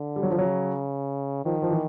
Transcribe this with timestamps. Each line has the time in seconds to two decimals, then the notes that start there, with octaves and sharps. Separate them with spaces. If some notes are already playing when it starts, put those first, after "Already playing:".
Already playing: D3
0.16 G3
0.23 F#3
0.31 F3
0.39 C#3 F#3
1.45 D#3 F3
1.62 F3
1.71 E3